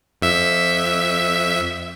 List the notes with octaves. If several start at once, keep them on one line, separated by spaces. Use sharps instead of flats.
F2 E5